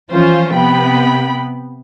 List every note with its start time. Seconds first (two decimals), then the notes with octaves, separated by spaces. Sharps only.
0.11 E3 F3 C#4 F4 C5
0.54 C3 B3 G5 B5